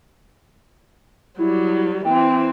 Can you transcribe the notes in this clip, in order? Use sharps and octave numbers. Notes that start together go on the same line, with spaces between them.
F#3 G3 E4
E3 C4 G5